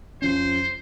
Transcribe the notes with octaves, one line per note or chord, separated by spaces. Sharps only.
F2 F3 C#4 C5